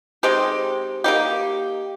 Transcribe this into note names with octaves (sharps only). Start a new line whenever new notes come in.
G#3 C4 D#4 G4
A#3 D#4 G4